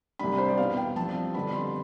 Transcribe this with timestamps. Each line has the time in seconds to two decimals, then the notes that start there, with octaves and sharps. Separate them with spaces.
0.19 C2 C3 G3 D4 B5
0.38 C5
0.48 D5
0.57 E2 B2 B3 E4 F5
0.77 G5
0.96 G2 F3 C4 E4 A5
1.34 F2 D3 G3 B3 B5
1.54 C6